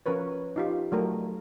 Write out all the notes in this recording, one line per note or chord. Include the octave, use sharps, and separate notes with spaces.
F3 C#4 A#4 B4 C#5
D#4 F4 G4
F#3 A3 A#4